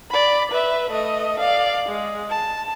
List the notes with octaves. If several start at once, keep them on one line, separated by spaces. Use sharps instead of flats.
D5 B5
B4 E5
A3 D#5
D5 F5
G#3
A5